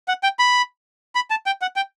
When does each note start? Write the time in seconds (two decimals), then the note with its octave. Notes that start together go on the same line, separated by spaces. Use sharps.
0.08 F#5
0.23 G5
0.39 B5
1.15 B5
1.30 A5
1.46 G5
1.62 F#5
1.76 G5